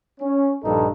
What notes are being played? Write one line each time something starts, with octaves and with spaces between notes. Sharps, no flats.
C#4
A#1 G2 D#4 A4